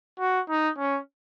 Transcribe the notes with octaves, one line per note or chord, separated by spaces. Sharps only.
F#4
D#4
C#4